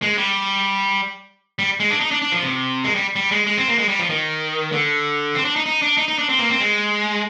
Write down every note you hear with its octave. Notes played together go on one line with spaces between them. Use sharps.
G#3
G3
G3
G#3
D4
D#4
D4
D4
F3
C3
G#3
G3
G3
G#3
G#3
C4
A#3
G#3
G3
F3
D#3
D3
C4
D4
D#4
D#4
D4
D#4
D#4
D4
C4
A#3
C4
G#3